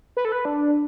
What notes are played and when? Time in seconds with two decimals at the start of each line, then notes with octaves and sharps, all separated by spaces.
0.17 B4
0.25 A4
0.32 B4
0.45 D4